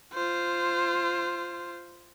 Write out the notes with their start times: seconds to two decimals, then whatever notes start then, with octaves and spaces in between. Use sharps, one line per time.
0.13 F4 C5